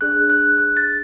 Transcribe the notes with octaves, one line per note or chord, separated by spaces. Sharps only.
D4 G#4 D5 F#6
F#6
F#6
A6